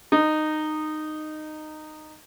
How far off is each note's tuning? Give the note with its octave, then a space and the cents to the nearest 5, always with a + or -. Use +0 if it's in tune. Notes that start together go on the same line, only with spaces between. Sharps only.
D#4 -15